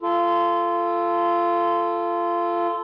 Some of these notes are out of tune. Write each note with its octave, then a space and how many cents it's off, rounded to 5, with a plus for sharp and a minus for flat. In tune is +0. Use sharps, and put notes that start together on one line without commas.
F4 -20 A4 +0